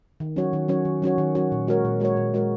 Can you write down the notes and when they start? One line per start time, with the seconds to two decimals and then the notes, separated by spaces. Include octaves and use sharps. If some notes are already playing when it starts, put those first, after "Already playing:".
0.20 D#3
0.36 F#3 C#4 F#4 C#5
0.53 D#3
0.68 F#3 C#4 F#4 C#5
0.85 D#3
1.02 F#3 C#4 F#4 C#5
1.18 D#3
1.35 F#3 C#4 F#4 C#5
1.52 A#2
1.67 G#3 F#4 A#4 C#5
1.85 A#2
2.00 G#3 F#4 A#4 C#5
2.17 A#2
2.34 G#3 F#4 A#4 C#5